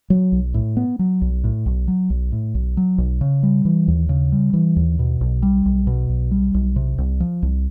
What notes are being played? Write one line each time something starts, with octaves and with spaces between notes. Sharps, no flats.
F#3
B1
A2
B3
F#3
B1
A2
B1
F#3
B1
A2
B1
F#3
B1
C#3
G3
E3
D#2
C#3
G3
E3
D#2
B2
B1
G3
B1
B2
B1
G3
B1
C3
C2
F3
C2